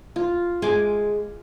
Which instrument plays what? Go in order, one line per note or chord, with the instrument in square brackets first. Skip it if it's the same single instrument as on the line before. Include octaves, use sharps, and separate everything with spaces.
[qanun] F4
[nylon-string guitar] G#3 [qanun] G#5 D6